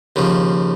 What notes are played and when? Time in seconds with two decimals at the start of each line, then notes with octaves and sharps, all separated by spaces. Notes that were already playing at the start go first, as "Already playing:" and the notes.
0.16 D#2 C#3 F3